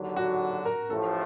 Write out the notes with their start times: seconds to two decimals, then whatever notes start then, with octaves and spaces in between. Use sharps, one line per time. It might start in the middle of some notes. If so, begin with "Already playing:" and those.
Already playing: D#2 D3 F#3
0.16 F#4
0.65 A#4
0.90 A1 A2 F3 A3 A4